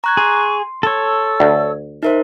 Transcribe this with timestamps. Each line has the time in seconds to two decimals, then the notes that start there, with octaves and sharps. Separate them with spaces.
0.04 A#5 C#6 F#6 G#6
0.17 G#4 C6
0.83 A4 C#5 E6
1.40 D2
2.03 D#4 A#4 C5 E5